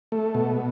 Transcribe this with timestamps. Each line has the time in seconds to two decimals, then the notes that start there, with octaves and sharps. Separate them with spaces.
0.12 A3
0.35 B2